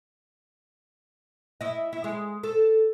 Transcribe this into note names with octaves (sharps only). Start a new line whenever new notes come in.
E4 D#5
E4
G#3
A4